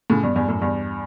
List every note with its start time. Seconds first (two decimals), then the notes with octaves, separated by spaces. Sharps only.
0.10 A2 C#3
0.22 G2 B2
0.36 E2 G2
0.48 F#2 A2
0.61 E2 G2